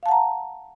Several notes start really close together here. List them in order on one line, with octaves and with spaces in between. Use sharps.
F5 A5 F#5 A#5